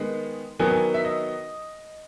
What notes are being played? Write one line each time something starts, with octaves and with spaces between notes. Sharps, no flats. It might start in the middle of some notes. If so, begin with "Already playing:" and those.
Already playing: D#3 G#3 B3
D#3 F#3 B3 G#5
G#5
E5
D#5